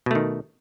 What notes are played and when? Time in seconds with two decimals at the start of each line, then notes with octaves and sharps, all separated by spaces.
0.06 B2
0.11 A3
0.15 D#3